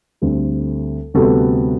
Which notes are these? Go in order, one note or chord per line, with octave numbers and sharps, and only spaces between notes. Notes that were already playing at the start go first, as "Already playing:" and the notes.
D2 D3 G3 C4
D2 C3 G3 B3 F#4 A4